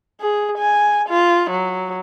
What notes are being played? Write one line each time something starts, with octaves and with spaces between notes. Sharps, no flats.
G#4
G#5
F4
F#3